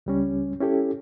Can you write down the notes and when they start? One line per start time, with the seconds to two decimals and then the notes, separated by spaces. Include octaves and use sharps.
0.06 C#2 G3 C#4
0.60 C#4 E4 G4 A4